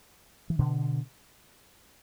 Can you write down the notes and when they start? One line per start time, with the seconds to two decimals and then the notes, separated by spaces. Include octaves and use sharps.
0.50 E3
0.59 B2 D3